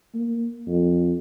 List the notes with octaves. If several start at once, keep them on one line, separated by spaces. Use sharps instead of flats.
A#3
F2